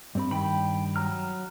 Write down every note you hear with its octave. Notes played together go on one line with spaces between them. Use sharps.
G2 C4 B5
G2 D#3 G5 B5
F#3 A#5 F6